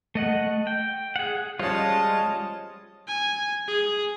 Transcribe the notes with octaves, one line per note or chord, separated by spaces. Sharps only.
A3 D#5 F#5
G5
G#4 F#5
F3 G3 G#3 C#4 F4 C#5 D#5 A5
G#5
G#4